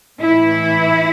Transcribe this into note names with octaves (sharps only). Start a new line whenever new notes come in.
A2 E3 E4